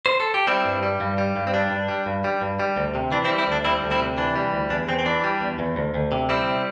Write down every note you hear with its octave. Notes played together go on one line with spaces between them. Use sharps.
C5
A4
G4
G3 C4 E4
G2
G3
G2
G3
G2
C4
G3 D4
G2
G3
G2
G3
G2
G3
D2
C3
E3 D4
C4 E4
G3
C4 E4
D2 D4
G3 C4 E4
D2
C4 E4
C3
E3 D4
G3
D2
E2 D4
E2 C4
C4
E3 D4
G3
E2
E2
D2
D2
C3
G3 C4 E4